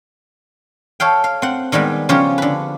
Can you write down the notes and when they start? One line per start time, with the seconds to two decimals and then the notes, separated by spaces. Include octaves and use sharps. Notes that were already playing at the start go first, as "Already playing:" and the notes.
1.00 A4 C#5 F5 G5
1.24 F5
1.42 C4 F#5
1.72 D#3 G3 G#3 B3
2.09 C#3 F3 C#4 F4 G4 C#5
2.38 D3 B4